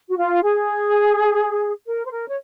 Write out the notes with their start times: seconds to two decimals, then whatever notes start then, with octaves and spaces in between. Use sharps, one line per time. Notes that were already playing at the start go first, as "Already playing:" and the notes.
0.09 F#4
0.18 F4
0.42 G#4
1.87 A#4
2.05 C5
2.12 A#4
2.29 C#5